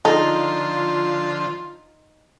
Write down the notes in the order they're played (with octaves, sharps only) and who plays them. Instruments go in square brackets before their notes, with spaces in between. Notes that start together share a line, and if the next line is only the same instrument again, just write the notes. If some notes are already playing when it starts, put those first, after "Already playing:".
[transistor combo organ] D3 F3 [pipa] D#4 [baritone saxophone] F4 [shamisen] G#4 A4